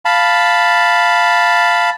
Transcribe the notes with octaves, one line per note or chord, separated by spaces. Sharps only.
F5 A5 B5